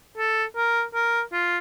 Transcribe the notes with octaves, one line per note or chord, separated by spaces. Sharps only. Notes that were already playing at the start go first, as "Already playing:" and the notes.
A4
A#4
A#4
F4